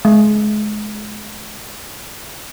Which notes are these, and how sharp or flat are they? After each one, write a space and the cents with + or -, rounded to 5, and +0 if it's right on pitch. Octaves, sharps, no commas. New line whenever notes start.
G#3 +30